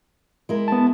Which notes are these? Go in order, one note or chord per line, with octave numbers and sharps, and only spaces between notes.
G#3 E4 A#4
B3 A5